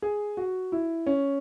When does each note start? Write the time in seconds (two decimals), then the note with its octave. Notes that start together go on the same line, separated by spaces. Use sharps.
0.02 G#4
0.37 F#4
0.72 E4
1.07 C#4